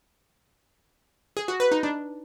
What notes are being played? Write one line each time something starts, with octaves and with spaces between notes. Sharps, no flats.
G#4
F#4
B4
D#4
D4